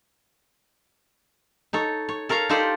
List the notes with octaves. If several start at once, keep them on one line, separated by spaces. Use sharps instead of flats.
D#4 A4 C#5
C#5
A4 A#4 C#5 F5 A#5
D#4 F4 G4 A4 C5 D5